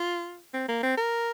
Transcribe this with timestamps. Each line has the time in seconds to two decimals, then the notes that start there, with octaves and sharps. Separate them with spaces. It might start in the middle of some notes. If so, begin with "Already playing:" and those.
Already playing: F4
0.54 C4
0.69 A#3
0.83 C4
0.97 A#4